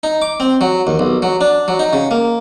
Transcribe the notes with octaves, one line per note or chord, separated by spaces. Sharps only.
D#4
D6
C4
F#3
D#2
B1
F#3
D4
F#3
D#4
C#3
A#3